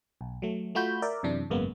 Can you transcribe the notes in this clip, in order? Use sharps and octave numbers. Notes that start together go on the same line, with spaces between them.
B1
F#3 A3
A3 F4 F#4 B5 G6
A#4 D5 E5
F#2 C3 E3 D4
G#1 F#2 C#3 G#3 A#3 B3